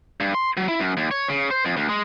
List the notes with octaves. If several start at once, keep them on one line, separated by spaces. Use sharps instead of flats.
G2
C6
F#3
E4
F#2
D#2
C#5
C#3
C5
F2
D2
G#3